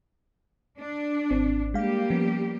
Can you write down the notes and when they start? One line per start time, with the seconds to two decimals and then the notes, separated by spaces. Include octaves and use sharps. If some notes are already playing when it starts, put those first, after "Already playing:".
0.79 D4
1.31 G#1 C4
1.74 G3 G#3 A#3 G4 F5
2.10 F3 B3 C#4